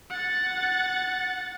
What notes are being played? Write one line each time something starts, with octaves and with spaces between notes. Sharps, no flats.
F#5 A6